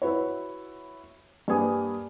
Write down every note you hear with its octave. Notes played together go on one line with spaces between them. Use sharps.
E4 F#4 B4 C#5
G2 G3 A#3 B4 G#5 D#6